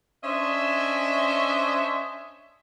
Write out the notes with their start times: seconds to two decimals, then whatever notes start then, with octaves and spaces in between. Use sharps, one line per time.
0.24 C#4 D4 C5 D#5 E5